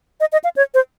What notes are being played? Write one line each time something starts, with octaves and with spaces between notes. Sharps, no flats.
D#5
D#5
F5
C#5
C5